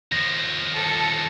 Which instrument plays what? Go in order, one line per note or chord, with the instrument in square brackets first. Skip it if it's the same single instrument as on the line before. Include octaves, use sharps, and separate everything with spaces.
[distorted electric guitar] D#2 F3 [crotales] A#6
[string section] A4 A5 C#7